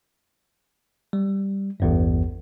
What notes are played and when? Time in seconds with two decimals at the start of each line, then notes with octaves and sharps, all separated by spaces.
1.13 G3
1.80 A1 E2 G2